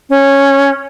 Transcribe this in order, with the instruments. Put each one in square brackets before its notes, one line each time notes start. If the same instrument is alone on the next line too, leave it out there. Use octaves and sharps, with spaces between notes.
[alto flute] C#4